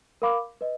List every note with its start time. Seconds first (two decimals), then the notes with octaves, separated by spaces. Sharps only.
0.22 A#4 F5 B5 D6
0.61 B4 D#5